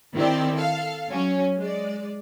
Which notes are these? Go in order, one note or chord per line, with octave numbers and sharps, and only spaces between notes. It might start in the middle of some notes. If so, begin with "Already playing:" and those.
D#3 C4 E4 G4 C5 D5
A4 F5
F#3 C#4
G#3 D5